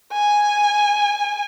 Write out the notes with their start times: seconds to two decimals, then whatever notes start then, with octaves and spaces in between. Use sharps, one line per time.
0.13 G#5